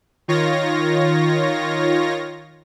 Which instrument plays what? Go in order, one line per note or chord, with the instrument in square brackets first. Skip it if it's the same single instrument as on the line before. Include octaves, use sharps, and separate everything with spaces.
[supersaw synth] D#3 F4 C#5 A#6